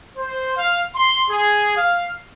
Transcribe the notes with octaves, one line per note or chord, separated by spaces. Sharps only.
C5
F5
C6
G#4
F5